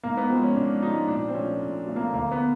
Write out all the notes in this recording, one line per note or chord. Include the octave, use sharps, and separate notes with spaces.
G#2 A#3
B3
F3 G#3 C4
C#4
G#2 D4
F3 G#3 D#4
A#2 D4
C4
F3 A3 C#4
A#2
F3 A3
A#3
D2 A#3
B3